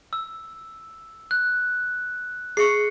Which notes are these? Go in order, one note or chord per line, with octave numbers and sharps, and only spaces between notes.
E6
F#6
G#4 E5 C#6 C7 C#7